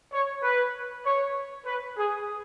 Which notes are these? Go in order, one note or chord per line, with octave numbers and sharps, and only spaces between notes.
C#5
B4
C#5
B4
G#4